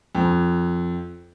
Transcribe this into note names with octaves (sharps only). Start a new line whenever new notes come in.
F2